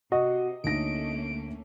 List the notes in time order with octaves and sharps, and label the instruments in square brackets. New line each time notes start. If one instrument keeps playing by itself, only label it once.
[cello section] C3 [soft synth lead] F#4 [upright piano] D#5
[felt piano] D2 D#4 A#6 [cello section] A3 A#3 C#4 [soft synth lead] D7